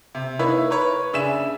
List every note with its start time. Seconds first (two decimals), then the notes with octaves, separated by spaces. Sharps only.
0.15 C3
0.39 A#3 D#4 E4 B4 C#5 E5
0.70 A#4 B4 C#5
1.13 C#3 D4 E5 G#5 E7